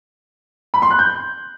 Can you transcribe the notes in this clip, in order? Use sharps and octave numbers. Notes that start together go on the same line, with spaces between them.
B5
C6
F#6
G6